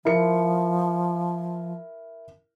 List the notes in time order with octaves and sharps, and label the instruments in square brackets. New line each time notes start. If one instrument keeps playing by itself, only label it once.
[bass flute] F3 [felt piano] E4 A#4 C#7